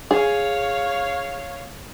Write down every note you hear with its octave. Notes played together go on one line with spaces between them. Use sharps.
G#4 C#5 F5